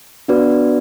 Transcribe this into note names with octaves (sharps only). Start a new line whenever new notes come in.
B3 D4 F#4 B4 D5